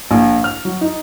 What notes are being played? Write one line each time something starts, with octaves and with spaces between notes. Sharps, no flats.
A#1
F6
F#3
D#4